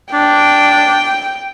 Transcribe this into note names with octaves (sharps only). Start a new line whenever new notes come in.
D4 G5